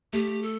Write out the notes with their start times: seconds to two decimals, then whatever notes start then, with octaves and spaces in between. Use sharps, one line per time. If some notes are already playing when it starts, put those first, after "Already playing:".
0.13 A3 G4
0.43 A4